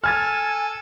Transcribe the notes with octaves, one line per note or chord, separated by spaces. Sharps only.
A4 G#5 F6 G#6 A6